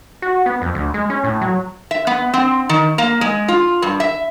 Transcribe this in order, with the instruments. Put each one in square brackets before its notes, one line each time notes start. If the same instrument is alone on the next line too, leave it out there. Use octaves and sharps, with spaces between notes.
[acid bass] F#4
B3
F2
D2
G#3
C#4
A2
F#3
[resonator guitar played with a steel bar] E5
B3
C4
D#3
A#3
G#3
F4
G2
E5